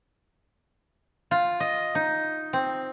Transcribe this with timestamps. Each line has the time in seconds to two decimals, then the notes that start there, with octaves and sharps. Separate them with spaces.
1.31 F4
1.60 D#5
1.95 D#4
2.53 C4